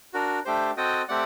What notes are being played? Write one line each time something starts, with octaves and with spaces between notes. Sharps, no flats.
D4 F#4 A#4
A3 D4 G4 C5
C4 F#4 A4 D#5 G5
A3 C4 G4 D5 F#5